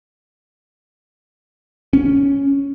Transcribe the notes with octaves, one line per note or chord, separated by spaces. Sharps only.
C#4